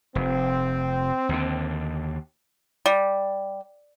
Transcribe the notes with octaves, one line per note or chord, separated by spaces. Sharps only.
F1 C4
D#2 D3
G3